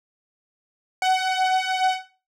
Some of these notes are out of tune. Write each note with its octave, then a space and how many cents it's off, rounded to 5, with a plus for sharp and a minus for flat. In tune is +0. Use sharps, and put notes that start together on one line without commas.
F#5 +20